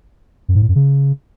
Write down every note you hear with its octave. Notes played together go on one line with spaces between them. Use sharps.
F#2
G#2
A2
F#2
C#3